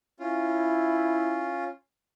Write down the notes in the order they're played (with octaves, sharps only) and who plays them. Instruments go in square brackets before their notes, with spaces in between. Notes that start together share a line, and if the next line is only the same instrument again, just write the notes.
[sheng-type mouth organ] C#4 F4 [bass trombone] E4